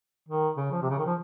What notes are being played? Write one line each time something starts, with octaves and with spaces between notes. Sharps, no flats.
D#3
C#3
F3
C3
C#3
D#3
F3